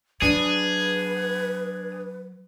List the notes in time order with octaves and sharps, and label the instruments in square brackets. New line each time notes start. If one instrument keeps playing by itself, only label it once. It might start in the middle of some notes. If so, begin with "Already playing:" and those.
[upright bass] F#3 [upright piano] D4 [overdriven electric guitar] G#4 [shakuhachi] B4